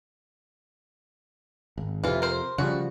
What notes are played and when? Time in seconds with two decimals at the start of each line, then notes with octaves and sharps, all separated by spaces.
1.78 G#1
2.04 F2 C3 E3 F4
2.22 A#4 C5
2.58 C#3 F3 G3 F#4